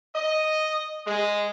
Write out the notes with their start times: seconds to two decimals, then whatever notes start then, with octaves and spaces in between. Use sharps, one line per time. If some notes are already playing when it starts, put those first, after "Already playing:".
0.15 D#5
1.07 G#3